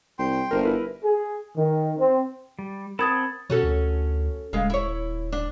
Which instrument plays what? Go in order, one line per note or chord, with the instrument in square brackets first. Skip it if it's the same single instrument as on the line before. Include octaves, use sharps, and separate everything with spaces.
[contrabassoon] C2 [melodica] G5 C6
[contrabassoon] G1 [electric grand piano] A#4 C5
[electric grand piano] E4 A#4 B4
[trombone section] G#4
D#3
C4
[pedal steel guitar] G3
[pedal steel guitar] C4 F#5 A5 [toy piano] A#4 D#6 [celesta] B5 G#6 A6
[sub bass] B2 [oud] C#4 F#4 A4
[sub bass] D2
[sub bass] D#1 [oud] C#3 G#3 F5
[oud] E4 C#5
D4